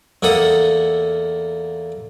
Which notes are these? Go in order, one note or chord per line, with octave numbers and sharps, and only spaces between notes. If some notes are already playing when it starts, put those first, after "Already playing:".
E2 A#3 A4 F#5 D#6